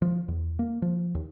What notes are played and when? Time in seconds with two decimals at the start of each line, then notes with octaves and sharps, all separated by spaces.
0.02 F3
0.28 E2
0.59 A#3
0.82 F3
1.15 D#2